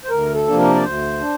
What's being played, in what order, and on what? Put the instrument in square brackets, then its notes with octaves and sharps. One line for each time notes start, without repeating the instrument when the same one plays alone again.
[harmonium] C5
D2 A#4
A4
C3 F3 A#3 D4
A#4
D5
D2 C5
D4